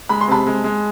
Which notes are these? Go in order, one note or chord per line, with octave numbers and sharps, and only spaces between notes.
G#3 B5
C6
C3 A5 B5
G#3
G#3